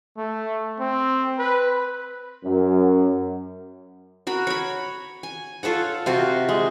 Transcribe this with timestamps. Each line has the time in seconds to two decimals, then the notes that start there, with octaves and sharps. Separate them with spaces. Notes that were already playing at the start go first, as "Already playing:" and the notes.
0.17 A3
0.80 C4
1.39 B4
2.44 F#2
4.27 F#4 A#4 B5
4.47 C#5 B5
5.23 G#5
5.63 F4 A4 C#5 F#5
6.06 C3 F4 F#4
6.49 G#3